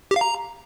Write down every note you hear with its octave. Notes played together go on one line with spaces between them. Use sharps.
G4
F5
A#5